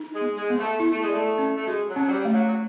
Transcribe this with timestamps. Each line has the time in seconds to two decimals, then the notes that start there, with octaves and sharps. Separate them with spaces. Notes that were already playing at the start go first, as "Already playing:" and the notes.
Already playing: D#4
0.14 G#3
0.21 B3
0.36 G#3
0.50 B3
0.59 A3
0.80 E4
0.91 A3
1.02 G#3
1.09 A3 D5
1.38 C#4
1.57 A3
1.67 G#3 F#4
1.89 F#3
1.96 C#4
2.06 F#3
2.10 G3
2.25 A3
2.33 F#3
2.48 F#3